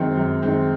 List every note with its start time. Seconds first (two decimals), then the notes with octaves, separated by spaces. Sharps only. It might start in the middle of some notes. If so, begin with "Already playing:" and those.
Already playing: F#2 D#3 G#3 C4
0.17 F#2
0.42 D#3 G#3 C4